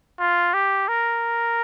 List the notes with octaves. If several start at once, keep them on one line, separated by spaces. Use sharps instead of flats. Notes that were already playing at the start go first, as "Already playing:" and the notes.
F4
G4
A#4